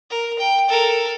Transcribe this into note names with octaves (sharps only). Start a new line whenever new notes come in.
A#4
G5
A4 A#4